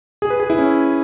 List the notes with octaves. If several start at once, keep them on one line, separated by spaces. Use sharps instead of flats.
G#4
B4
G#4
E4
C#4